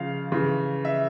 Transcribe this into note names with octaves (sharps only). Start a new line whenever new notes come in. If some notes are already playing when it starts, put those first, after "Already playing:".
Already playing: C#3 F3 F5
C#3 E3
E5